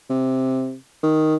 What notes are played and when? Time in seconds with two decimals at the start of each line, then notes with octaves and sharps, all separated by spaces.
0.10 C3
1.03 D#3